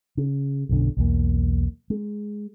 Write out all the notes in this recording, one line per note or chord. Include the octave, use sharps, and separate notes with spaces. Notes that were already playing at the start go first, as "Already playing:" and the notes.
C#3
B1 F#2 B2 D3
B1 E2 A#3
G#3